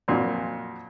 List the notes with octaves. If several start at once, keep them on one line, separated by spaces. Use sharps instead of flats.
F2 A#2 F#3